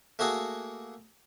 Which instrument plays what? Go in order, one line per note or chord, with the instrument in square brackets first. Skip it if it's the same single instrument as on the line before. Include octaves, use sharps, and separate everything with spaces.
[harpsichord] A3 A#3 F#4 G#4